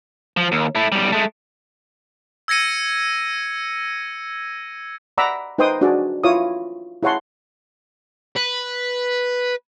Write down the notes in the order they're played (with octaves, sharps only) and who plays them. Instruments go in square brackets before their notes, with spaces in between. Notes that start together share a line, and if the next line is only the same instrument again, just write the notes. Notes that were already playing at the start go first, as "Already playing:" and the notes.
[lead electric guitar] F3
D#2
A3 E4
B1 G3
G#3 A3
[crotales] E6 G#6 A#6 C#7 D#7
[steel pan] D5 F#5 A#5 B5 D6 E6
D#4 B4 C5 G5 C6 D#6
D4 F#4 G#4 D5
E4 F4 C#5 F5 D6 D#6
E4 G#4 C#5 F#5 A5 C6
[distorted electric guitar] B4